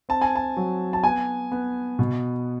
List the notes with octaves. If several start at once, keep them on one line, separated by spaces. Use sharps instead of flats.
C4 A5
G#5
A5
F#3
A5
B3 G#5
B3
B2